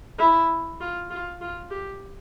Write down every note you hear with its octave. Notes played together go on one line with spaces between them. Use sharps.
E4
F4
F4
F4
G4